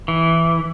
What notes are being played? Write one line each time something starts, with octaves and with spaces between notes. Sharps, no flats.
E3